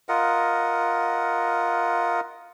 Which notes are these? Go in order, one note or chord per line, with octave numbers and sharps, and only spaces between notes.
F4 A#4 D#5 F#5